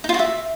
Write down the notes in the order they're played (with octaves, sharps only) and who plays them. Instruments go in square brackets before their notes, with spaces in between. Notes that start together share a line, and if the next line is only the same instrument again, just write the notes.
[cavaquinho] D#4
F4
F#4
E5